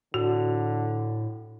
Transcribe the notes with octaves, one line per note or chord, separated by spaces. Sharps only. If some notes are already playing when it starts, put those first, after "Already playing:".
A2 D3 F#4